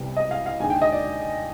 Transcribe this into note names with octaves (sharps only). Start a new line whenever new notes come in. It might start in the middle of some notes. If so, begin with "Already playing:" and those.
Already playing: C2 C3 G3 B3
D#5
F5
F5
D#2 D3 G#3 G#5
G5
D#5
D5